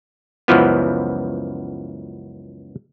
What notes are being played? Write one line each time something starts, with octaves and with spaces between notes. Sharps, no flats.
C#2 F#2 E3 F3 B3